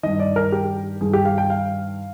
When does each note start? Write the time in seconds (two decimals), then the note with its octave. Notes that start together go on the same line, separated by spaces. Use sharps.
0.03 G2 D#3 D#5
0.20 D5
0.36 A#4
0.52 G4
1.01 G2 D#3 G#4
1.13 G4
1.25 F5
1.38 G5
1.50 F5